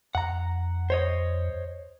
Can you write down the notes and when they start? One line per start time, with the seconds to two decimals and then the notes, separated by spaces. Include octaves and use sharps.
0.15 F2 F#5 A#5
0.90 C5 C#5 D#5